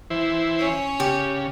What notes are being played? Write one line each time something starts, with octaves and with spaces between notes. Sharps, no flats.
E3 E4 C5
C#4 C#5
C#3 G4